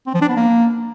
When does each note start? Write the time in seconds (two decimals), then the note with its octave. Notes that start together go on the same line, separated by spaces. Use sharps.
0.07 C4
0.14 F3
0.22 D4
0.29 B3
0.36 A#3